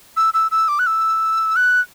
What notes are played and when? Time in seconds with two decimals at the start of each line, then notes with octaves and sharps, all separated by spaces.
0.17 E6
0.34 E6
0.51 E6
0.68 D6
0.79 F#6
0.86 E6
1.56 F#6